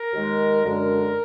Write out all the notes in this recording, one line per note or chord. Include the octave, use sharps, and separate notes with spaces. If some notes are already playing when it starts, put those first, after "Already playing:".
Already playing: A#4
D#2 D#3 G#3
F#2 D3 G#3 A#4